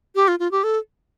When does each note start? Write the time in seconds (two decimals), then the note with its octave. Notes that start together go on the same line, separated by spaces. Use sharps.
0.15 G4
0.28 F4
0.39 F4
0.51 G4
0.64 A4